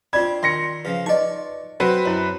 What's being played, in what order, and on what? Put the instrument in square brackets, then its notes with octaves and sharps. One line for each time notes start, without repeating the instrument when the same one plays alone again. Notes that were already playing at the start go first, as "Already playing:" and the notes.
[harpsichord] C4 D4 [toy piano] F4 D5 B5 [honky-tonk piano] G#6
[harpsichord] D#3 [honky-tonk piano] C6 A#6 C#7
[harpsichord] C#3 F3 [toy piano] B4
[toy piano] D#4 B4 D#5 [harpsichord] D5 C#6
[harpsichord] F#3 [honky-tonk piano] C4 F#4 B4
[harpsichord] F#2 [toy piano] E4 C#5